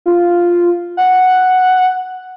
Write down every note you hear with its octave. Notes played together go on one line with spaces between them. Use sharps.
F4
F#5